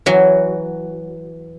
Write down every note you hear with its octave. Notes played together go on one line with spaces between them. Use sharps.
E3 F#3